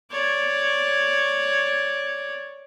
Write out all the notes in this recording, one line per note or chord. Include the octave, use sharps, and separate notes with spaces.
C#5 D5